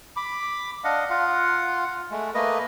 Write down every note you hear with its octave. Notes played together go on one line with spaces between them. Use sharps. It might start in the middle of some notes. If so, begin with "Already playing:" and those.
B5 D6
D4 D#5 F5 F#5
F4 F5 F#5
G#3 A3
A3 A#3 B4 D#5